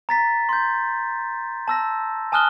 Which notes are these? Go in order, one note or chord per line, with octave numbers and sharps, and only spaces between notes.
A#5 A6 B6
C6 G6
A5 E6 A#6
G#5 A5 D#6 F6 F#6 G7